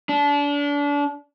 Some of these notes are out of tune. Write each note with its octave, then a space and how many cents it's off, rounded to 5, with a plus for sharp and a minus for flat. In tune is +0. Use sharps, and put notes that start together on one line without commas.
D4 -30